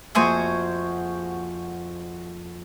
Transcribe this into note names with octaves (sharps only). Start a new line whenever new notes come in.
F2 A#3 F#4 G#4 C5 E5